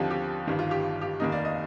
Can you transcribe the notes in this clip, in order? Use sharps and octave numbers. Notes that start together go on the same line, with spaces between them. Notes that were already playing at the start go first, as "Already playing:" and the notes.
Already playing: D#2 D3 F3 C4 D#4 G4
G4
G1 G2 D#3
F4
G4
G4
F1 D#2 D#3 A#3 D#4
D5
D#5